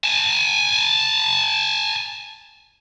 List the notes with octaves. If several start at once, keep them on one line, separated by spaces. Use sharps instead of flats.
G#5 A5